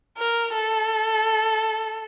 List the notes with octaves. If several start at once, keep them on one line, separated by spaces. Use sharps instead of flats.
A#4
A4